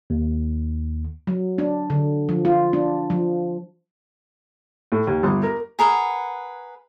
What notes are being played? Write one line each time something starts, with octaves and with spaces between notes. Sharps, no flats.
D#2
F#3
D4
D3
F3
F4
D4
F3
A2
D#2
G1
A#4
G#4 A#4 B4 F#5